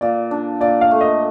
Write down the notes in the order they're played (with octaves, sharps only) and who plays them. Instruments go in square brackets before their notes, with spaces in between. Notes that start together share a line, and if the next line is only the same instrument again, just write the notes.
[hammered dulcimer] A#2 [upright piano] D5
[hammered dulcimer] D4
[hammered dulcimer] A#2 [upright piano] D5
[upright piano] F5
[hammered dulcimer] A3
[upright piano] D#5